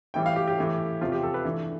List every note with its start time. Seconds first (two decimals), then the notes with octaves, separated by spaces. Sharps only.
0.14 A2 E3 G3 G5
0.26 F5
0.36 G4
0.47 G4
0.58 A2 E3 A3
1.01 E2 C3 F3 F4
1.12 G4
1.23 A4
1.34 B4
1.45 G2 E3 A3